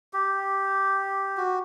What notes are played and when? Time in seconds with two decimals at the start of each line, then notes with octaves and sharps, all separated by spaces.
0.13 G4
1.37 F#4